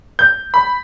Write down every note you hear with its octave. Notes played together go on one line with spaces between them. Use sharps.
G6
B5